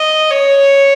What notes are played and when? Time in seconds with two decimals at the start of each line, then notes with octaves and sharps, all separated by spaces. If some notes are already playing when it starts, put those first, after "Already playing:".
Already playing: D#5
0.32 C#5